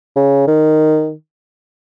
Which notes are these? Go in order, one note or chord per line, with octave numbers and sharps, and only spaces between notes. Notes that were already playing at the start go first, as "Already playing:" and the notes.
C#3
D#3